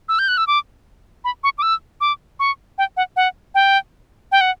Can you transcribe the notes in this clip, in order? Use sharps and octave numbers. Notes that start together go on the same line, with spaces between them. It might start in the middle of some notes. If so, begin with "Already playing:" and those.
E6
G6
F#6
E6
D6
B5
C#6
D6
E6
D6
C#6
G5
F#5
F#5
G5
G5
F#5